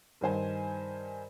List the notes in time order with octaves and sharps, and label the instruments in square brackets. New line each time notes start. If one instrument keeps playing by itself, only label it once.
[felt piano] G2 D#3 C5 G#5